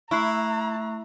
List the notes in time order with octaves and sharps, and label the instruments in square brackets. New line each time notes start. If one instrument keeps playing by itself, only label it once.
[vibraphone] A3 [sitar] E4 [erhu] A#5 [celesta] C#6 F#6 C7